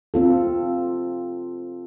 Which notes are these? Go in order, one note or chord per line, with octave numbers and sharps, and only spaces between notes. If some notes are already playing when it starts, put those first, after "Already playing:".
C4 F4 A4